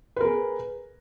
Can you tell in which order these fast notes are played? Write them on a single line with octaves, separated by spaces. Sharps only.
B4 A#4 G#4